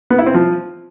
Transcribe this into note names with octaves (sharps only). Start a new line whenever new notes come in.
B3
E4
C4
F3